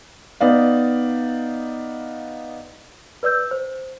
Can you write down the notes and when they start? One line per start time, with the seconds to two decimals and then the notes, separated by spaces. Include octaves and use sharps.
0.41 B3 D#4 D5 F5
3.23 B4 D5 E6 G6
3.51 C5